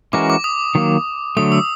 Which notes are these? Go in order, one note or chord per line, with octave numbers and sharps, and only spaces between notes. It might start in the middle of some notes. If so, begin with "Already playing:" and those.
E3 G#3 C#4 F#4 A#4 D6
D6
D#6
D#3 F#3 A#3
D3 F#3 A3 D#6
E6